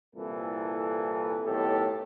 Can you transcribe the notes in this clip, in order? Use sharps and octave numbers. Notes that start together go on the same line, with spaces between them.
C2 A#2 E3 A4
B1 A2 D#3 G4 A4